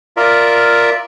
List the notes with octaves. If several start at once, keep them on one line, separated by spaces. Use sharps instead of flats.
F4 A#4 D5 E5